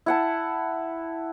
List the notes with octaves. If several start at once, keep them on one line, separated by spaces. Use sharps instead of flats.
E4 F#5 A5